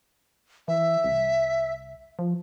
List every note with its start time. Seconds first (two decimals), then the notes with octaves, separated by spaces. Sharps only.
0.68 E3 E5
1.04 C2
2.19 F3